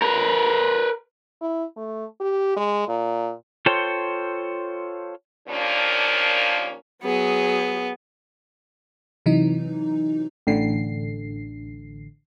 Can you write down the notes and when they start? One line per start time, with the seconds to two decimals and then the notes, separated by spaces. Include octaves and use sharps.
0.02 A#4 B4
1.41 E4
1.77 A3
2.20 G4
2.56 G#3
2.88 A#2
3.66 F4 A4 C5 C#5 G5
5.48 D#2 A#2 F3 A#3 C#4 D4
7.03 F#3 B3 G#4
9.26 C3 E3 F#3 D#4
10.47 A1 D3 C7